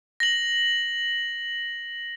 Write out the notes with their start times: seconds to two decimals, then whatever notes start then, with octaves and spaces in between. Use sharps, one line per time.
0.20 A#6 F#7